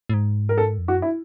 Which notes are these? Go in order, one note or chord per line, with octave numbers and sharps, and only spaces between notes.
A2
G#2
A#4
A4
F2
F#2 F#4
E4